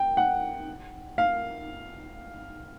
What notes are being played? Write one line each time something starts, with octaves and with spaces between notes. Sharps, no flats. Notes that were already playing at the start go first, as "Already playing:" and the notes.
Already playing: G5
F#5
F5